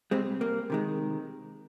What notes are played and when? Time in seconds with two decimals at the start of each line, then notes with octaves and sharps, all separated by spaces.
0.11 C3 G3 G#3 C4
0.41 A#3
0.70 C3 D#3 G#3